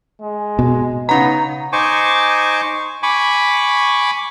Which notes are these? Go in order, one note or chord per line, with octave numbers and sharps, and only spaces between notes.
G#3
B2
C#3 B3 D#4 C#5 A#5
D#4 C5 G#5 C#6 D6
G#5 B5 C#6 D6